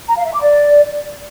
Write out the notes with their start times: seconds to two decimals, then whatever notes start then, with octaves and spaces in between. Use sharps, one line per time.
0.08 A#5
0.17 F5
0.25 E5
0.33 D6
0.42 D5